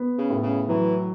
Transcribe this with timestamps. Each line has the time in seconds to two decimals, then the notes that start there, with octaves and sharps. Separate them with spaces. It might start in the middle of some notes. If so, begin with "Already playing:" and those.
Already playing: B3
0.18 C#3
0.30 A2
0.43 C#3
0.68 E3 F#3